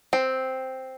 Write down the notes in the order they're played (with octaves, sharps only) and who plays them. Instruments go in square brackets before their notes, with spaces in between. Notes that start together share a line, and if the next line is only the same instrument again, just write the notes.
[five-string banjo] C4